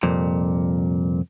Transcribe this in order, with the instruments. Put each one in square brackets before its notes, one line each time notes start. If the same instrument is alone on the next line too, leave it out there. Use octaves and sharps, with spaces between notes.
[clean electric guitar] C2 F2 A#2